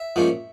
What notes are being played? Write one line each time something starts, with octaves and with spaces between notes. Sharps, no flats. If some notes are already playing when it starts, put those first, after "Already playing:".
Already playing: E5
G#2 F3 A#3 C#4